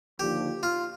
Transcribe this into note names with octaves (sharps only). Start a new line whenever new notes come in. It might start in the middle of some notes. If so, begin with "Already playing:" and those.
D#2 D3 F3 G4
F4